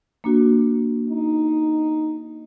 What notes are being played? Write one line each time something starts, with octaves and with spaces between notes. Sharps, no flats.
A#3 D4 F#4
D#4